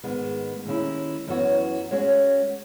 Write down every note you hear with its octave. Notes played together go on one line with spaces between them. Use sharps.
G#2 D#3 G#3 B3
D#2 D#3 G#3 C#4 E4
F#2 E3 B3 F#4 C#5
G#3 C#4 F#4 C#5